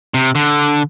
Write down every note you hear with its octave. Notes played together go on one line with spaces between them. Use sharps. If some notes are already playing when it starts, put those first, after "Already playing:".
C3
D3